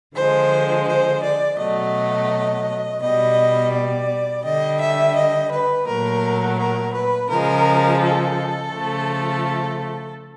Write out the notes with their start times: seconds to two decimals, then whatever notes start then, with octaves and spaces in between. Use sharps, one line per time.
0.15 D3 F3 G#3 C5
0.87 C5
1.22 D5
1.58 B2 F#3 A3 D#5
3.01 B2 G3 D#5
3.72 D5
4.44 D3 G3 D#5
4.80 E5
5.15 D#5
5.51 B4
5.86 A#2 F#3 A3 A#4
6.58 A#4
6.94 B4
7.29 C#3 F3 G#3 A#4
8.01 A4
8.72 C#3 F3 A3